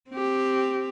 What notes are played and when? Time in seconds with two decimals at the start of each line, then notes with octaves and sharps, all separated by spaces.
0.11 C4 G4